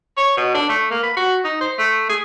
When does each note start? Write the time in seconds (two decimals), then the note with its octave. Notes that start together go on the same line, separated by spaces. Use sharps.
0.17 C#5
0.37 B2
0.55 D4
0.69 A3
0.91 A#3
1.03 B4
1.17 F#4
1.44 D#4
1.61 C5
1.79 A3
2.10 G#4